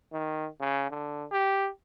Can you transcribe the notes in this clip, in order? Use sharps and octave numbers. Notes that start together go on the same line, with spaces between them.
D#3
C#3
D3
G4